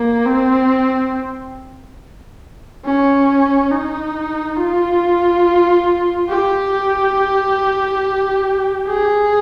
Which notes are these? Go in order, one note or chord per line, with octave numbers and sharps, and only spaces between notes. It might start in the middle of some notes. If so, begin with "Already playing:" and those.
Already playing: A#3
C4
C#4
D#4
F4
G4
G#4